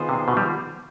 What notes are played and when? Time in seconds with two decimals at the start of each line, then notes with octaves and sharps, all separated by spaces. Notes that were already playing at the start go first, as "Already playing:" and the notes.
Already playing: D#3 B3 F4 G#4 C5
0.09 C3
0.28 B2
0.37 G3